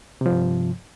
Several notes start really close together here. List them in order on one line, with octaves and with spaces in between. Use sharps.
C3 F3 G2